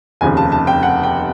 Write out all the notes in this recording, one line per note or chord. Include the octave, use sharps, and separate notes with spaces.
F1 D#2 C#3 F3 G#5
A5
A5
G5
F#5
G5